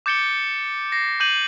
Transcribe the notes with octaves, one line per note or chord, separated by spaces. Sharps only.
D6 G6 A6 C#7 D7 G7
A#6 C7
D6 G6 D#7 F#7